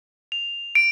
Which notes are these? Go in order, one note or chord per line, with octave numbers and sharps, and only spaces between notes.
F7
D7